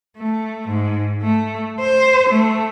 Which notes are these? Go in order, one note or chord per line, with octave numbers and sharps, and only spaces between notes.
A3
G#2
A3
C5
A3